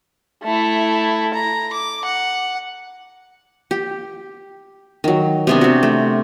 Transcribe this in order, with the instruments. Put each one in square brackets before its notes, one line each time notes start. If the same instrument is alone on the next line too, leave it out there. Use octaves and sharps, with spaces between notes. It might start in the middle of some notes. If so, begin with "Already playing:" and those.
[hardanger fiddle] A3 E4
A#5
D6
F#5
[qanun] G4
D#3 F#3
C3 B3 D4
C4 F#4
A3